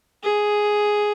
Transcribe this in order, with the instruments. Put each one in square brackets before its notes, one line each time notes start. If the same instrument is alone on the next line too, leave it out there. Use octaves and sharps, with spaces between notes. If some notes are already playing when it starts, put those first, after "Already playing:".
[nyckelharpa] G#4